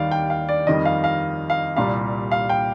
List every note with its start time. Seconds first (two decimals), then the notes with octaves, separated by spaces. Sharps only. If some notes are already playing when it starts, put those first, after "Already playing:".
Already playing: D#2 D#3 G3 D5 F5
0.11 G5
0.30 F5
0.49 D5
0.67 F2 D#3 G3 D#5
0.85 F5
1.04 F5
1.50 F5
1.76 C2 A#2 G3 F5
2.31 F5
2.49 G5